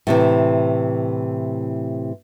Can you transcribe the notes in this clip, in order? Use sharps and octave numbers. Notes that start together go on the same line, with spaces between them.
A2 C3 E3